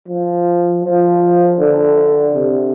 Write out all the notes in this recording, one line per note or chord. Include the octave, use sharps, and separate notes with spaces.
F3
F3
D3
C3